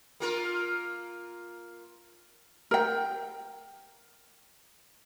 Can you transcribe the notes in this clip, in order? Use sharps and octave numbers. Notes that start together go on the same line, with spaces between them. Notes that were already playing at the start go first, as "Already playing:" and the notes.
A#3 F4 A#4
A#4 G5